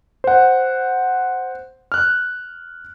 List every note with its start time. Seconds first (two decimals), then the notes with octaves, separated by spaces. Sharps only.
0.24 C5 F#5
1.92 F6 F#6